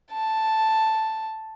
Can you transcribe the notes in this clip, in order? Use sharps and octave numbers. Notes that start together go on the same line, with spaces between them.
A5